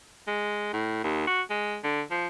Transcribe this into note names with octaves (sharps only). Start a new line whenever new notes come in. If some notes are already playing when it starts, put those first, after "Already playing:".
G#3
A2
D#2
F#4
G#3
D3
F3